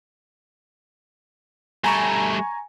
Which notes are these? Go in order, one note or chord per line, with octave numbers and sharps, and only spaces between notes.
G3 A3 G#5 A#5 C#6